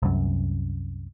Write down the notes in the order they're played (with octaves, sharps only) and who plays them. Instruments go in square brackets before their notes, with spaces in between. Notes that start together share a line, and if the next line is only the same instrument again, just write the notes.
[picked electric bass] C2 F#2